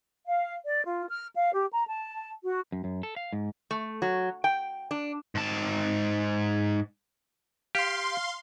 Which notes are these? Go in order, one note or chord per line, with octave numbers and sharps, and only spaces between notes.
F5
D5
F4
F6
F5
G4
A#5
A5
F#4
F#2
F#2
A4
F5
G#2
A3
F#3
G5
D4
G#2 A5
G4 F5 C6